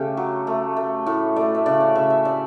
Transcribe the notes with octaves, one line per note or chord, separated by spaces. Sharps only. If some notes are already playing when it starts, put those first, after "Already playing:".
Already playing: C#3 A3 G4
F#3
A3
A3
A2
A3 D5
E5
C#3 D5
C#5
C#3 E5
E5
A3 D5